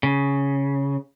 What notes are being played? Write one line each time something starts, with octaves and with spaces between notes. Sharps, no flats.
C#3